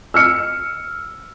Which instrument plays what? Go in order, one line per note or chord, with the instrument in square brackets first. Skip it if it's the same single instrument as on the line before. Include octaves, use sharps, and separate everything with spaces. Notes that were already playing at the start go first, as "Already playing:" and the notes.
[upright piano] E6 F6 C#7